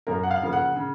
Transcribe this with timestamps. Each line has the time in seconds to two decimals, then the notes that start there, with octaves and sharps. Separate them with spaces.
0.07 F#2 A#4
0.23 F#5
0.31 F5
0.42 C#3 F3 A#3
0.53 F#5
0.76 C#3